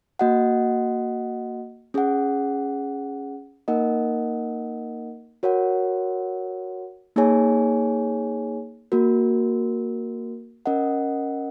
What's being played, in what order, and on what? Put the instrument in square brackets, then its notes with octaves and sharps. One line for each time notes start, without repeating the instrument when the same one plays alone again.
[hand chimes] A#3 F#4 D#5 F#5
C#4 G#4 F#5
A#3 D#4 A#4 D#5 F#5
F#4 A#4 C#5 F#5
A#3 D#4 G#4 C#5 G#5
A#3 F#4 A#4
C#4 A#4 D#5 F#5